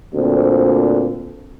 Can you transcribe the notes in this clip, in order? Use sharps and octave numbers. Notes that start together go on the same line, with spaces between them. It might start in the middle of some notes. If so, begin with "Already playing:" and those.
D2 A#2 C4